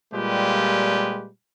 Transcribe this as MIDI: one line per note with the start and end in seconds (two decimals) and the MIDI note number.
0.13 1.27 46
0.13 1.27 55
0.13 1.27 56
0.13 1.27 65
0.13 1.27 67
0.13 1.27 71